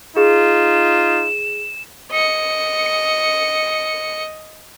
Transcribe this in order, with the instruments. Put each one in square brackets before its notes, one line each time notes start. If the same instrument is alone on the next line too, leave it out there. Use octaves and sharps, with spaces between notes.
[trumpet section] D#4 F4 [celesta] G#4 [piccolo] E7
[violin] D#5 C#7